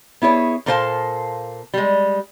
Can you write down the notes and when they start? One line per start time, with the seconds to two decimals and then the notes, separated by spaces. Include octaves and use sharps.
0.22 B3 E4 G#4 C#5
0.66 A#2 A#3 A4 C5 F5 A5
1.74 G3 G#3